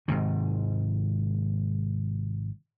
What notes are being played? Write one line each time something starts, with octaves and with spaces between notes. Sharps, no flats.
G#1 G#2 C3 D#3